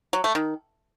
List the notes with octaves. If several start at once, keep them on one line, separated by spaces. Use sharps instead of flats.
F#3
A3
D#3